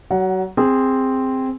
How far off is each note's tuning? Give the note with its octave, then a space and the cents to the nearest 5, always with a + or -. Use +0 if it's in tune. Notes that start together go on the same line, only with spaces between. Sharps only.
F#3 +30 F#5 +0
C4 +0 G#4 -15